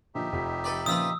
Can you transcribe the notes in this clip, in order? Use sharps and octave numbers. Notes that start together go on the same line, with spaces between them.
A#2 D3 F3 D#4 G4 E5
F1 F3 B6
A4 B4 D5
A#2 C#3 F3 F4 B4 F5 D#6 E6